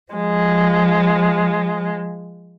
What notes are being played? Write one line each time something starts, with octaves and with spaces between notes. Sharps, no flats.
F3 G#3